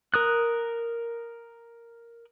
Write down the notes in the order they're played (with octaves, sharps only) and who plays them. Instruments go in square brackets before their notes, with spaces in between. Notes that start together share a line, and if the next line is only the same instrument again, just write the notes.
[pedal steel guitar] A#4 D#6 F#6